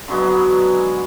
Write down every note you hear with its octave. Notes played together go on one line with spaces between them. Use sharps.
D3 F#3 G#3 B3